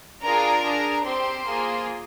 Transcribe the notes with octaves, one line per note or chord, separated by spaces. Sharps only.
D4 F4 G#4 A#4 A#5
D4 G#4
C4 G4 C5 C6
A#3 F4 G#4